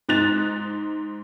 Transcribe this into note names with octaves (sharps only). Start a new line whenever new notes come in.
G#2 D#4 F#6 A6 E7 F7